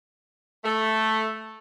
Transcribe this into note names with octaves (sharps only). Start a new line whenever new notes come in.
A3